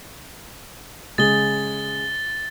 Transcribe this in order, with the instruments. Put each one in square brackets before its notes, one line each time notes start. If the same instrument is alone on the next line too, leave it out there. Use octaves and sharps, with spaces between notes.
[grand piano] C#3 G#3 G#4 [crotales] A6 G7